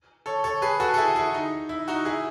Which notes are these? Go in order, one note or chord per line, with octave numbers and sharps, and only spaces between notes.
A4 C#5
A4 C#5
G#4 B4
F#4 A4
A4
E4 G#4
E4 G#4
D#4
E4
D#4 F#4
E4 G#4